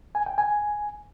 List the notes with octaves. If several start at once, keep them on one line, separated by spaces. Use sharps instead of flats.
G#5
G5
G#5